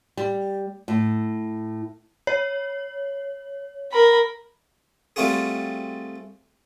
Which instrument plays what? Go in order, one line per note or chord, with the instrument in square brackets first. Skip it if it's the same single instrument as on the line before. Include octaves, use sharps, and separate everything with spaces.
[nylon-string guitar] G3
A2
[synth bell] C#5
[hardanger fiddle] A#4 B5
[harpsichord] G3 A3 C4 F4 F#4 G#4